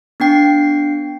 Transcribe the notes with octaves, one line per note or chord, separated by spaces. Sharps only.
B3 D4 G5 C7